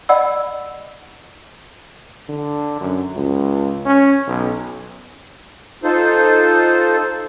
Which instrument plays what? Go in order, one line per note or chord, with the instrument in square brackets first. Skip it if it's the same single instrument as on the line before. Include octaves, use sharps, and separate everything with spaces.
[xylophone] D5 D#5 F#5 B5 E6
[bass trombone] D3
F#2
C#2
C#4
B1
[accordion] D#4 F4 A4 C5